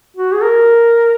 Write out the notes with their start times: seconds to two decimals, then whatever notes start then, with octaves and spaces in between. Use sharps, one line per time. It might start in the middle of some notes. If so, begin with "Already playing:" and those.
0.16 F#4
0.33 G#4
0.43 A#4